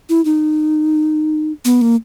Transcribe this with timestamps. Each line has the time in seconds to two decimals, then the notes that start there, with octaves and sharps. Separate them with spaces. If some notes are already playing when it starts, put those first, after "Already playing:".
0.09 E4
0.25 D#4
1.65 B3
1.81 A#3